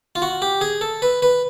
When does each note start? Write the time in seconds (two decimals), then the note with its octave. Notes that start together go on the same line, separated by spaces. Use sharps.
0.15 F4
0.22 F#4
0.42 G4
0.61 G#4
0.81 A4
1.02 B4
1.22 B4